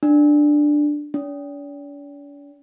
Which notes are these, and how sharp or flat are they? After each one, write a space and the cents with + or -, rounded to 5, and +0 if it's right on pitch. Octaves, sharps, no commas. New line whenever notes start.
D4 +5
D4 -45